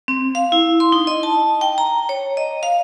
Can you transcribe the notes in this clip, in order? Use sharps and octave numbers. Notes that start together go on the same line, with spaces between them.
C4
F5
E4
C6
D#4
D#5
A5
G5
A#5
C#5
D#5
F5